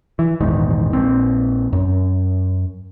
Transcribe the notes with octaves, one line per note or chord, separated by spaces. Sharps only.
E3
A#1 E2 G#2 D#3
A#1 C4
F#2